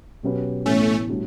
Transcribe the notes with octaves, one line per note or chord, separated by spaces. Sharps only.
B2 F#3 C#4 G4 B4
A2 E3 A3 B3 C#4
A2 G3 D4 F#4